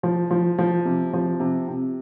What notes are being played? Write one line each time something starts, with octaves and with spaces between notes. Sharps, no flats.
F3
F3
F3
C3
F3
C3
C3